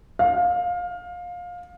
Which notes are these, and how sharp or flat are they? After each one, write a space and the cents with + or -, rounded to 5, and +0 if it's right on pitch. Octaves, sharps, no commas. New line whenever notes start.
F5 +20